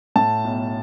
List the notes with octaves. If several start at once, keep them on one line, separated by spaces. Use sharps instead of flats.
A2 A5
B1